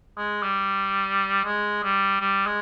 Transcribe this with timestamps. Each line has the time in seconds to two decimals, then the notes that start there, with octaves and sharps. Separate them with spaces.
0.17 G#3
0.43 G3
1.44 G#3
1.83 G3
2.21 G3
2.46 G#3